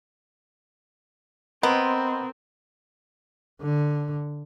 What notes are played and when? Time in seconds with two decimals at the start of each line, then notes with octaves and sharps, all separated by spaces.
1.63 B3 C4 A#4 D#5 C6
3.62 D3